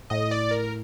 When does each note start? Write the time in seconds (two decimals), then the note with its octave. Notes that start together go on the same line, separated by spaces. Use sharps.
0.10 A2 D#5
0.31 D5
0.51 A#4